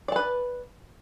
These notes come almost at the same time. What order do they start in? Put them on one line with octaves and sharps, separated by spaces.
D5 A5 B4